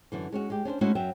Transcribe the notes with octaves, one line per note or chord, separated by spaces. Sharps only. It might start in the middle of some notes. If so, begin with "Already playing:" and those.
F#2 D3 E3
G#3 C#4 F#4
G#3 G4
C#4 D4 F#4 C5
G#3 A3 C#4 D#4 E4 F#4
F#2 F#3 E5 G5